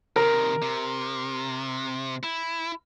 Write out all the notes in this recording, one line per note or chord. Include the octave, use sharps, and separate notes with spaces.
C3 D#3 A#4
C3
E4